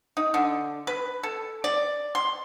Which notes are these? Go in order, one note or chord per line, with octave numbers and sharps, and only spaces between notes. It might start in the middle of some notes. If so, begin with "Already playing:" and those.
D#4
D3
B4
A4
D5
C6